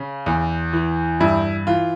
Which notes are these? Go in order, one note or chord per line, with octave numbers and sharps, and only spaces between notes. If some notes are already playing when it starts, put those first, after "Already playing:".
Already playing: C#3
E2
E3
G2 E4
E3 F4